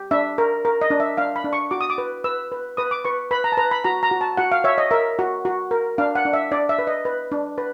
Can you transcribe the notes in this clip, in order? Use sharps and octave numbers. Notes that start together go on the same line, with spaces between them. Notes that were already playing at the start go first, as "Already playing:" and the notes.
Already playing: G4
D4 E5
A#4
A#4
D#5
D4
E5
D4 F5
B5
D4
C#6
F#4 D6
D#6
D6
B4
B4 E6
B4
B4 D#6
D6
B4 C#6
B4 B5
A#5
A5
B4 A#5
B5
F#4 A#5
A#5
F#4
A5
F#4 F#5
F5
C#5 E5
D#5
A#4 E5
F#4
F#4
A#4
D4 F5
F#5
D4
E5
D4 D5
E5
B4
D#5
B4
D4
B4